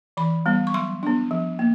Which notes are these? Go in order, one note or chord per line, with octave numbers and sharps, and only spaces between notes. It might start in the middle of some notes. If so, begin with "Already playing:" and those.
E3 B5
G3 B3
C#6
F#3 C6
B3 D4
F3
A#3